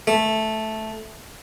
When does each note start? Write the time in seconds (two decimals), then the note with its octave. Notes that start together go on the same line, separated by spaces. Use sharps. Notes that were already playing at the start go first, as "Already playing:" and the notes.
0.07 A3